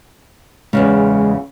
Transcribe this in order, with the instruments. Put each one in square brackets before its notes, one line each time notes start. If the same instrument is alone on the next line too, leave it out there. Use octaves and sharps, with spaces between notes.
[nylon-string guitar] E2 A2 C#3 [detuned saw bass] G#3